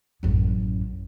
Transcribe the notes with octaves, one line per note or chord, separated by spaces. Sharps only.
A1 F#2